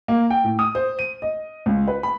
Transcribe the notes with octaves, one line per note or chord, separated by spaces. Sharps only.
A#3
G5
A2
D#6
C5
D#7
D#5
C#2
B4
B5